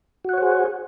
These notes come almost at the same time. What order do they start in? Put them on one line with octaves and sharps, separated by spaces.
F#4 F#5 C#5 C5 G#4